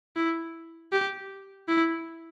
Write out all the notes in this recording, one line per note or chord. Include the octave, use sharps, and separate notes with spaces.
E4
G4
E4